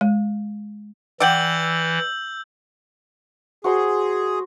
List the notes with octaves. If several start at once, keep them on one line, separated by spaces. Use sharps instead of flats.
G#3
E3 D5 F#5 G5 E6 G6 F#7
F#4 G#4 C5 C6